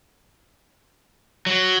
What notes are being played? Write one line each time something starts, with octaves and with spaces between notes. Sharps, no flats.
F#3